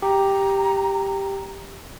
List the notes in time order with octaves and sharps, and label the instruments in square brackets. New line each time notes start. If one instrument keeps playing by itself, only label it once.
[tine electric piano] G4 [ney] A#5